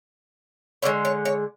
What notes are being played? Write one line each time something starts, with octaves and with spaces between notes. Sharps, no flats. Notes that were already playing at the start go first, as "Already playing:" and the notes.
D3 F3 G#3 C#5
C#5
C#5